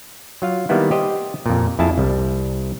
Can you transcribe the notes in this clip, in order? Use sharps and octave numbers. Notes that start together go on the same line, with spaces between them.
F#3 F4 F5
D#3 G3 A#3 B3 E4
G4 C5 D#5
F2 A#2
F2 E4 G#4 A5
C2 G3